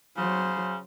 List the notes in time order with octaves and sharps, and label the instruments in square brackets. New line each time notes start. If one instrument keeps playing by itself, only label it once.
[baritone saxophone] C#3 [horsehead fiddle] F#3 C5